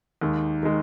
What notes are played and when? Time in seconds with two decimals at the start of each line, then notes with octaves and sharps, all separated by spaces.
0.21 D#2 D#3 G#3
0.63 D#3 G#3